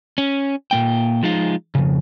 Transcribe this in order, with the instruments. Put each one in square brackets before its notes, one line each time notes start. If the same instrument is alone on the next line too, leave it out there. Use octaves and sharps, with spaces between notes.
[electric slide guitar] C#4
A#2 A#3 G5
F3 G#3 D#4 F4
F2 G#2 C#3